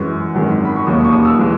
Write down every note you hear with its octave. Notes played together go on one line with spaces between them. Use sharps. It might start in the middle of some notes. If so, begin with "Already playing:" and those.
Already playing: F#2 E3 G#3 C#6
G#1 F#2 D#3 G#3
B5
C#6
E1 D#2 D#3 A#3 C#4 D#6
C#6
D#6
E6
E3 G#3